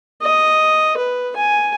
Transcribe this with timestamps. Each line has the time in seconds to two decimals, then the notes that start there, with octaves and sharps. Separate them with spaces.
0.22 D#5
0.97 B4
1.36 G#5